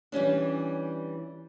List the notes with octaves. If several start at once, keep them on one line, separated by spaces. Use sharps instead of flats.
E3 G3 C#4 D4